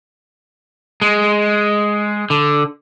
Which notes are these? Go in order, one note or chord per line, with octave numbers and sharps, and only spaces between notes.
G#3
D3